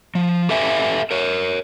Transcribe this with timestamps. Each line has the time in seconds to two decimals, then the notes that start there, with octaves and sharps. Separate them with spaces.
0.15 F3
0.49 G4 A4 B4 E5 G5 G#5
1.11 A#4 C#5